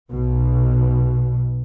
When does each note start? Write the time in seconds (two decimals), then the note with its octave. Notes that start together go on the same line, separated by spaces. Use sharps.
0.11 B1 B2